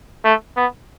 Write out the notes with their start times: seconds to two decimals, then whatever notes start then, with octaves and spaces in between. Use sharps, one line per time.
0.25 A3
0.57 B3